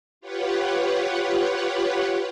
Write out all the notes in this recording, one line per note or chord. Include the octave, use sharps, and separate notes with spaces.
F4 G4 B4 C#5 F#5